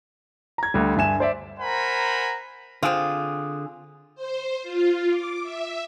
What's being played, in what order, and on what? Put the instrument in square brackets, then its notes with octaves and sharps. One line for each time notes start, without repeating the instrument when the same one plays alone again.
[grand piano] A#5 G#6
D2 G3
G2 D3 E5 G#5 E7
C5 D5 E5
[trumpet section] A#4 C5 F#5 G#5 A#5 B5
[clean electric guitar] D3 G#4 [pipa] C4 F4
[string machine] C5
F4
D6
E5